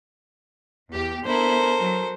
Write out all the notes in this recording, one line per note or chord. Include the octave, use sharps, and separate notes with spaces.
E2 G4
B3 D4 E4 A4 A#4 C5
F#3